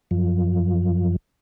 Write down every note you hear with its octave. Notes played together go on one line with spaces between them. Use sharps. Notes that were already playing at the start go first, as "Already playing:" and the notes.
F#2 F3